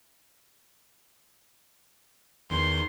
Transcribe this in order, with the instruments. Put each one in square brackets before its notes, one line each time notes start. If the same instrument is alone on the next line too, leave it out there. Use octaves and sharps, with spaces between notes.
[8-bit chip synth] E2 D#3 [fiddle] C6